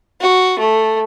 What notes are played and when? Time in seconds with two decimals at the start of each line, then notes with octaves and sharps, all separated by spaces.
0.21 F#4
0.59 A3